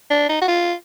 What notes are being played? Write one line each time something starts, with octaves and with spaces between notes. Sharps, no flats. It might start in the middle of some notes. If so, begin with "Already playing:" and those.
D4
D#4
F#4
F4